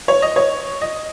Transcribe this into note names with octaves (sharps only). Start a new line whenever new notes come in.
C#5
D#5
C#5
D#5